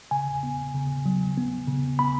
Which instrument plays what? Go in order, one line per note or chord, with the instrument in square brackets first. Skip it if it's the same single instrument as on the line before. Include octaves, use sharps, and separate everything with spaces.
[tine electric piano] C#3 G#5
B3
C#3
F#3
B3
C#3
B3 B5